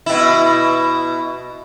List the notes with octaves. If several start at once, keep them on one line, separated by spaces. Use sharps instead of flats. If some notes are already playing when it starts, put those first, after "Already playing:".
B2 E4